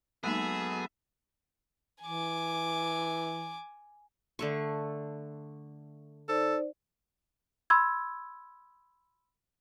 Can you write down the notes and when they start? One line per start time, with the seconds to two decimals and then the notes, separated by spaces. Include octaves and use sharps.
0.24 F#3 G#3 A#3 B3 D#4 G#4 A4 E5
2.03 E3 G#5 D6
4.39 D3 A3 C#6
6.29 D#4 A4 C5 D5
7.70 B5 C6 E6 G#6